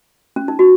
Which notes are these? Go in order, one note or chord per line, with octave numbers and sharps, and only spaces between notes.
C#4
D#4
F#4